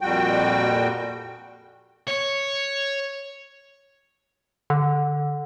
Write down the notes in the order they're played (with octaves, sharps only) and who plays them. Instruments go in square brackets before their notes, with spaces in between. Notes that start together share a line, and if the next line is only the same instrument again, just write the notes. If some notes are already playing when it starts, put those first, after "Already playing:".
[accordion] F2 A#2 G3 F#4 G5
[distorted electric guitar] C#5
[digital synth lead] D3